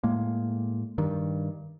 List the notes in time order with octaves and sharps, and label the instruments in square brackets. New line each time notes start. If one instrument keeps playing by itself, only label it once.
[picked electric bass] A2 G#3 A#3
G2 D#3